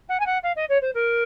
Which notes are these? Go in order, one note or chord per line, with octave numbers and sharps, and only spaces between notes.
F#5
G#5
F#5
F5
D#5
C#5
C5
A#4